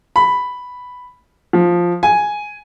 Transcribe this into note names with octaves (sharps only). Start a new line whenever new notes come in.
B5
F3
G#5